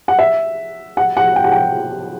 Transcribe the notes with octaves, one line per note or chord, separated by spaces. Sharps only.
F#5
E5
F#5
F#5
G5
F#5
G5